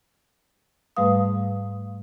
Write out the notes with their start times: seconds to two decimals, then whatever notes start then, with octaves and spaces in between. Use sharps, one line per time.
0.97 G#2 G3 A3 B4 F5 D#6